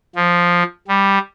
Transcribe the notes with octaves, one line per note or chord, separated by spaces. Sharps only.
F3
G3